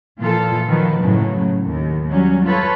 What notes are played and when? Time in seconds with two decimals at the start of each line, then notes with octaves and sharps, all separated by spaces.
0.19 A#2 E3 F3 F4 A4
0.70 D#3 F3 F#3 B4
1.02 A2 C#3 F#3
1.65 D#2
2.10 F#3 G3 C#4
2.45 F4 A4 B4 C#5